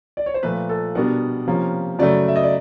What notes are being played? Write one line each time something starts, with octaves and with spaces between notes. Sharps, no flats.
D5
C#5
C5
A#2 F3 A3 B4
A4
B2 G3 B3 D4 A#4
C3 F3 A#3 C#4
F#2 C#3 F#3 A3 D5
E5
D#5
D5